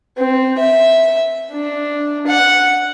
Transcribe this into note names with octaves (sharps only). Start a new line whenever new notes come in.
C4
E5
D4
F#5